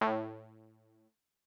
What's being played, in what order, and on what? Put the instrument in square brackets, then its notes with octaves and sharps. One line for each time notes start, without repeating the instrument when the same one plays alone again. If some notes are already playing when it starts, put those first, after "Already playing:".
[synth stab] A2